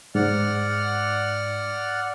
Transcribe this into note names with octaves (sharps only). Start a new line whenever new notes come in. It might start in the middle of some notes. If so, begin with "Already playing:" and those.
G#2 D5 F#5 F6